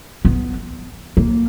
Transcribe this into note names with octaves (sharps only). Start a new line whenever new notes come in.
B3
A#3